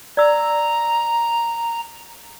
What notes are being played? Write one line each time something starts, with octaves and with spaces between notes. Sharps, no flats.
D5 A#5 E6